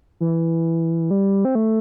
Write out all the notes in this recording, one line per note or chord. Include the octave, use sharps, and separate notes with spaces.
E3
G3
C4
A3